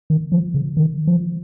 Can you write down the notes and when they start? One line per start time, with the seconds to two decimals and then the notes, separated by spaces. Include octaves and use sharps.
0.10 D#3
0.32 F3
0.54 C#3
0.77 D#3
1.07 F3